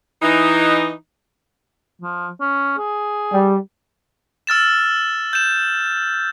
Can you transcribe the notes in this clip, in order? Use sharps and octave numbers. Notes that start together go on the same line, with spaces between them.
E3 D#4
F3
C#4
G#4
G3
E6 F6 A6 E7
G6 E7